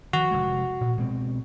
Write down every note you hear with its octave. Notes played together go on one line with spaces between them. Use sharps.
D#3 F3 F#4
F1 G#3
A#2
B2 G#3 C4